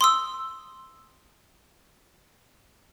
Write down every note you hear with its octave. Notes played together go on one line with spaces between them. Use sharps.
C6 D#6 E6